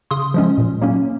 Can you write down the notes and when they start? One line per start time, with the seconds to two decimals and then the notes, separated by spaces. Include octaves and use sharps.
0.11 C#3 C6 D#6
0.34 F3 G#3 C#4
0.58 A#2
0.81 F#3 A#3 C#4